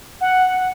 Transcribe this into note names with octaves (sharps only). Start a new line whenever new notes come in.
F#5